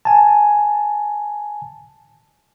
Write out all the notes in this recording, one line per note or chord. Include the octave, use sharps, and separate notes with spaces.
G#5 A5